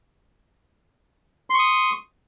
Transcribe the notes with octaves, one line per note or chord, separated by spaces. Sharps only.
C6 C#6 D#6